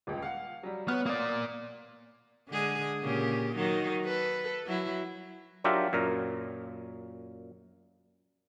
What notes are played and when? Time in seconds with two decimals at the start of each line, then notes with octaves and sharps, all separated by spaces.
0.07 D#1 C#2
0.22 F5 F#5
0.63 F#3 G3
0.88 B3 C#5 F6
1.06 A#3 D5 D#6
2.49 D3 G#3 G#4
3.03 A#2 C#3 G4
3.56 D#3 F#3 D#4
4.05 A4 B4
4.66 F#3 E4
5.64 F#3 D4 F4 G4 A#4 E5
5.93 F#2 A#2 A#4